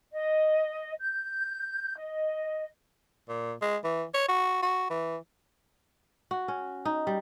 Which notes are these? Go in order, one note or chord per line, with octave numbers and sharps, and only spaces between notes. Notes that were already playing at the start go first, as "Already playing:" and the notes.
D#5
G6
D#5
A#2
G#3
E3
C#5
F#4
F#4
E3
F#4
C#4
D#4
G3